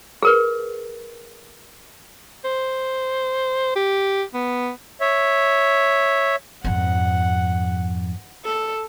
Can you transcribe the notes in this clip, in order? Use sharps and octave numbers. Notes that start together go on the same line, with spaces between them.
G#4 A#4 B4
C5
G4
B3
C#5 E5
F2 G#2 F#5
A4